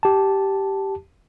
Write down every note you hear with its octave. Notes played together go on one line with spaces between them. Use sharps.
G4 A5